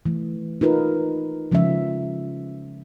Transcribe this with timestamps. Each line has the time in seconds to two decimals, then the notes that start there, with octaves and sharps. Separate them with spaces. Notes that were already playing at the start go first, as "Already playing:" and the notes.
0.06 E3 A3
0.61 D#4 F4 A#4 B4
1.52 C#3 F3 G#3 C#4 F4 E5